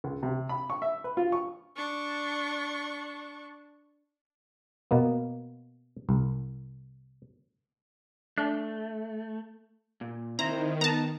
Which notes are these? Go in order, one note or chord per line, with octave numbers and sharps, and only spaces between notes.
C#2
C3
B5
C#6
E5
B4
F4
C#6
D4 C#6
B2 A#3 B3
C2
A3 D4
A#2
D#3 C4 E4 C5 A#5
B3 A5 A#5